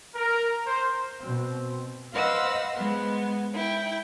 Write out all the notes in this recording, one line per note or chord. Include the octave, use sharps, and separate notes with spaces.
A#4
C5
B2 C4
B4 C5 D#5 F5 F#5 E6
G#3 B3
E4 G5